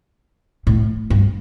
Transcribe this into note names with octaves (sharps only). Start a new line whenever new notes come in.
A2
G2